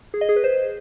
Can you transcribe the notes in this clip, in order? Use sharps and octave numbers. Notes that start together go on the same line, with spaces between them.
G#4
D#5
G#4
B4
C5